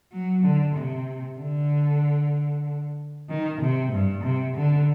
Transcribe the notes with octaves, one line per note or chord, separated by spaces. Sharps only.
F#3
D3
C3
D3
D#3
C3
G2
C3
D3